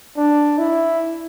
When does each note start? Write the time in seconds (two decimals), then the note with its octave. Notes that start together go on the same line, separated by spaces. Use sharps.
0.17 D4
0.58 E4